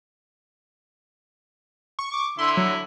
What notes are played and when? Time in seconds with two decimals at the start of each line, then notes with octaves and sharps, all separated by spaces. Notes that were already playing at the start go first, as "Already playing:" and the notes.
1.99 C#6
2.12 D6
2.39 D3 E4 C6
2.57 F#3